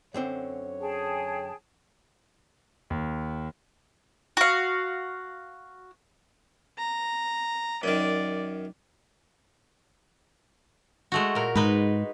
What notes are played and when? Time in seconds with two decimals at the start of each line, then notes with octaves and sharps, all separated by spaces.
0.14 F#2 D3 C4 C#5
0.80 G#4 G5 A5
2.90 D#2
4.37 F#4 F5
6.78 A#5
7.83 F#2 D#3 D5
11.12 G#3 A3 F#4
11.35 A#2 A#4
11.55 G#2 G#3 D#4 B4